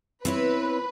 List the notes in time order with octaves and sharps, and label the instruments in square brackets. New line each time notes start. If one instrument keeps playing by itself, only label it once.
[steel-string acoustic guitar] C4 E4 C#5 [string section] B4